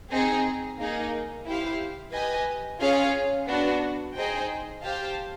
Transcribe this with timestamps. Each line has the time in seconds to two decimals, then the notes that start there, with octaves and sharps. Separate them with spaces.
0.11 C4 D#4 G#4
0.79 A#3 D#4 G#4
1.46 E4 G4 C5 F5
2.13 G4 B4 D#5 G#5
2.81 C#4 F4 G#4 C#5 F5
3.47 B3 D4 F#4
4.15 D#4 G#4 C5 D#5 G5
4.83 G4 C5 F5 A5